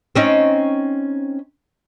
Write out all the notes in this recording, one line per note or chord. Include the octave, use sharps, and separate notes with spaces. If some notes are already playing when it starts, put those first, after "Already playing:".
C4 C#4 D#4